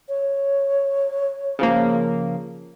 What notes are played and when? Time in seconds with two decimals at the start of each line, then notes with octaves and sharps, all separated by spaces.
0.09 C#5
1.59 C#3 F3 A#3